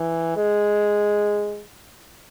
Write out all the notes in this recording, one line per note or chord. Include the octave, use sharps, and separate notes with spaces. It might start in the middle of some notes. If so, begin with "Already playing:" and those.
Already playing: E3
G#3